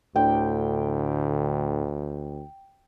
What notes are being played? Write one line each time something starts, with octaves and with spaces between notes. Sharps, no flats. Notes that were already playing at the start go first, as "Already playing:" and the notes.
D2 A2 D3 G5